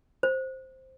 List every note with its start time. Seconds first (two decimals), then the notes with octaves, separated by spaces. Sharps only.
0.23 C5